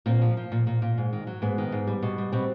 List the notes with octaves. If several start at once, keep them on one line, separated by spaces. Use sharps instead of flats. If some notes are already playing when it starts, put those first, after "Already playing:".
A#2 C4
F3
F3
A#2
A#2
A#2
G#2
D#3
F#3
G#2 B3
D#3
G#2
G3
B2
G3
B2 C4